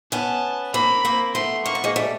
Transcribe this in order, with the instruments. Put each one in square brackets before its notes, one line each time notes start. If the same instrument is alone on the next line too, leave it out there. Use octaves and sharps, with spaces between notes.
[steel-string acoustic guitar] B3 C#4 [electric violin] A5
[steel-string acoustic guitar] A#3 C4 [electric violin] B5
[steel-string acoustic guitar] A#3 C4
[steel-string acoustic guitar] A3 B3 [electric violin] C6
[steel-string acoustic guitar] A#3 [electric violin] C#6
[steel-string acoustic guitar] B3
G#3 A#3
G3 A3